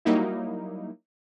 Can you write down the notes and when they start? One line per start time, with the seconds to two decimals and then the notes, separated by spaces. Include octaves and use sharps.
0.05 F#3 G3 A#3 D#4 E4